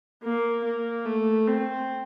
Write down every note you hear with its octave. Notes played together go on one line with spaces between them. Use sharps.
A#3
A#3
A3
C4